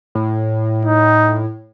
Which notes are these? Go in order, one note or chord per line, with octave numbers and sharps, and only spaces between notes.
A2
D#4